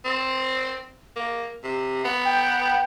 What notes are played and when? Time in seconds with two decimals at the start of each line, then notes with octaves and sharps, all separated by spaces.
0.05 C4
1.16 A#3
1.64 C3
2.05 B3
2.25 G5